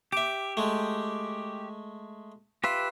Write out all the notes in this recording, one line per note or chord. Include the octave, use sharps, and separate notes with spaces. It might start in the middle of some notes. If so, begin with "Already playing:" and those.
G4 E5 D6
G#3 A3
F4 G4 B4 E5